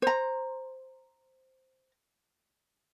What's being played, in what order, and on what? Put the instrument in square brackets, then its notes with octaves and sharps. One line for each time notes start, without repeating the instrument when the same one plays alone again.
[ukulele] C5 A#5